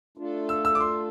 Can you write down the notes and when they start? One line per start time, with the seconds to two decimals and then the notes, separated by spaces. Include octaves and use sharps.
0.17 A3 D4 F4 A4
0.49 E6
0.65 E6
0.75 D6
0.80 C6